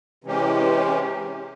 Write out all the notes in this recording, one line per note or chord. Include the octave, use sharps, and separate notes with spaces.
C3 E3 G#3 C#4 G4